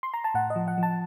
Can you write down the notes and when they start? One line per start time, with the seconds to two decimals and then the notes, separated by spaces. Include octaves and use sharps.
0.03 C6
0.14 A#5
0.24 A5
0.34 A2 F#5
0.50 D#5
0.56 F3
0.68 F#5
0.78 F3 A5